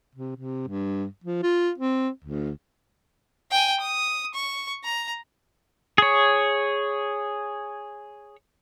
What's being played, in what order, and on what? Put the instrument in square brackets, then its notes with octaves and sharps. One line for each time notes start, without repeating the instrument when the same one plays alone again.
[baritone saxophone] C3
C3
G2
F3
F4
C4
D2
[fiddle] G5 G#5
D#6
C#6
A#5
[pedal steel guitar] G#4 C#5